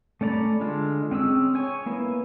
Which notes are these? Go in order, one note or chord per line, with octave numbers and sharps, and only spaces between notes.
A3 C#4 D5 A#5 B5
D3 G#3 F4
C4 C#4 G#4 E6
C#5 G#5 C#6
A#3 B3 E4